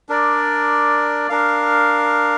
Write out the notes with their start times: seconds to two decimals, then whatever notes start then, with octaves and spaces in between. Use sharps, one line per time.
0.09 D4 A#4 D5
1.29 D4 A#4 F5